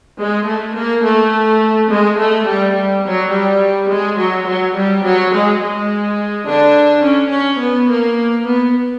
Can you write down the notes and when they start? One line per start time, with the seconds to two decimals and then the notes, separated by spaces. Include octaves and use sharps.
0.17 G#3
0.46 A3
0.75 A#3
1.04 A3
1.89 G#3
2.18 A3
2.46 G3
2.75 G3
3.04 F#3
3.32 G3
3.89 G#3
4.18 F#3
4.47 F#3
4.75 G3
5.04 F#3
5.33 G#3
5.62 G#3
6.47 D3 D4
7.05 C#4
7.33 C#4
7.62 B3
7.91 A#3
8.48 B3